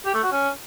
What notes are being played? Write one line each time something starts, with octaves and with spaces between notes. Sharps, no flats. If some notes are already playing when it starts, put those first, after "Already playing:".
G4
A3
F#4
C#4